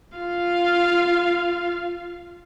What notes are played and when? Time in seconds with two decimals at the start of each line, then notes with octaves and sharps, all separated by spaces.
0.18 F4 F5